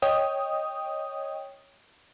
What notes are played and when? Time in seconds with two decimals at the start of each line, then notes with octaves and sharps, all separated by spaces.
0.02 C#5 D#5 G5 D#6